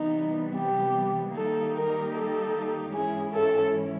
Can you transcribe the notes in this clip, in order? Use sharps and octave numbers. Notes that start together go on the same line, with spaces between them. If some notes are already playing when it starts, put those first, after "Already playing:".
Already playing: C3 E3 G3 B3 D#4
G4
D#3 G3 A#3 D#4 G4 A4
A#4
A4
G#2 E3 G#3 C#4 E4 G#4
A4